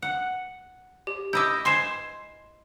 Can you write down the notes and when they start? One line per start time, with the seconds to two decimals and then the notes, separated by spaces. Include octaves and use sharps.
0.02 F#5
1.07 G4
1.33 E4 D#5 E5 D6 G6
1.65 C5 G#5 C6 C7 E7